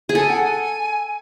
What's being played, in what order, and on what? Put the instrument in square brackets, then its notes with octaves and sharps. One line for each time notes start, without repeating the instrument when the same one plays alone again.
[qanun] G#4
[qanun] A4 [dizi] G#5
[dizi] F#5
G#5